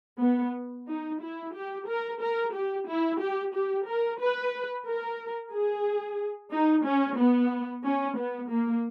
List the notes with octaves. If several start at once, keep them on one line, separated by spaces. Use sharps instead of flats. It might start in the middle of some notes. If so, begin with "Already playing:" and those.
B3
D#4
E4
G4
A#4
A#4
G4
E4
G4
G4
A#4
B4
A#4
G#4
D#4
C#4
B3
C#4
B3
A#3